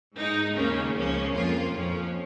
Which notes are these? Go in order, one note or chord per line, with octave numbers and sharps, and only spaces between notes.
G#2 G#3 D#4
D#2 C#3 A#3 C#4
C#2 C#3 F3 A#3 C#4
F2 F3 A#3 F4
F2 F3 C#4